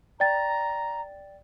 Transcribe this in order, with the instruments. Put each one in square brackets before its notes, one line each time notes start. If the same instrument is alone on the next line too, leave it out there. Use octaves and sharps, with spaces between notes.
[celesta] D5 G5 A6 [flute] A#5